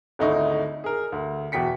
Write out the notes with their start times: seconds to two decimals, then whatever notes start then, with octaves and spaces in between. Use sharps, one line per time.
0.19 G#1 D2 A3 D#4 E4 C#6
0.84 G#4 A#4
1.12 D2
1.52 E2 B2 G5 B6 C#7